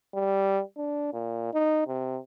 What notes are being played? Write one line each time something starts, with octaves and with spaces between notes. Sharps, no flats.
G3
D4
A#2
D#4
C3